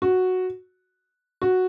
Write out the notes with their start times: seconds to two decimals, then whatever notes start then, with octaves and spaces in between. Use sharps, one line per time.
0.02 F#4
1.42 F#4